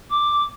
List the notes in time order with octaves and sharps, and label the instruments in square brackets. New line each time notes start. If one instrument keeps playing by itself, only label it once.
[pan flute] D6